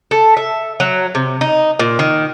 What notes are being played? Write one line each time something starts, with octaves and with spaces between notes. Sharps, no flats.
A4
E5
F#3
C3
D#4
A#2
D#3